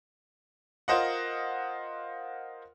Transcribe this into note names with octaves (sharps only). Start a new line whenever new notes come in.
F4 A#4 C5 D#5 F#5